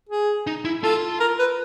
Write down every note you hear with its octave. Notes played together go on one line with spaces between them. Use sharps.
G#4
D#4
E4
F4 A4
A#4
B4